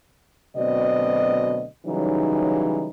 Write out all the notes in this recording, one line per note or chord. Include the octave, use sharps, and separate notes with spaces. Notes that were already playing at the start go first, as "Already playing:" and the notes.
D2 B2 F#3 C4 D5 D#5
C#3 E3 F#3 G3 D#4